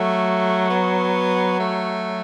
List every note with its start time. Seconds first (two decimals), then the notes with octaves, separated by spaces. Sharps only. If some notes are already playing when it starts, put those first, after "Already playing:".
Already playing: F#3 A3
0.70 B3
1.60 A3